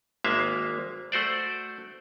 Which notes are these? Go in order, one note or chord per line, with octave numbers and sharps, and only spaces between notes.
G#1 G#3 A#3 E5 F5
A3 F#4 C5 D5